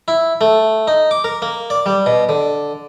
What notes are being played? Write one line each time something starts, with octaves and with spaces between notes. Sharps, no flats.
E4
A3
D#4
D6
A#4
A#3
D5
G3
B2
D3